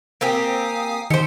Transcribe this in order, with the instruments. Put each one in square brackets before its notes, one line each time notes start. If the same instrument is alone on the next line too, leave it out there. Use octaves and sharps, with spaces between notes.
[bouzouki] A#3 C4 G4 [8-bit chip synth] F5 G#5 D#6
[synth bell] D#3 C#7 [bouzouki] G4 C5